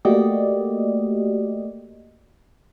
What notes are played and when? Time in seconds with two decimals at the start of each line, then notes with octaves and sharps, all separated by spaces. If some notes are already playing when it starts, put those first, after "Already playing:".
0.05 A3 A#3 F#4 G4 D5 D#5